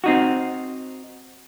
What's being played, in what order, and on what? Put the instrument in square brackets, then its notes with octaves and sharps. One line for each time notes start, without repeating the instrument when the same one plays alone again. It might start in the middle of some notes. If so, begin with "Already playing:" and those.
[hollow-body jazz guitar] C4 D#4 F#4